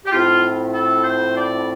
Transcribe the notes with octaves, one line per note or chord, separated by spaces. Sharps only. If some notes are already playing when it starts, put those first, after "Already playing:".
G4
A2 F3 C4 F4
A4
C5
D5